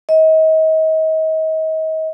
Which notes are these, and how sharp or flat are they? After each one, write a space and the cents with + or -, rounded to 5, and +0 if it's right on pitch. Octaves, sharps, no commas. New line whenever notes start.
D#5 +35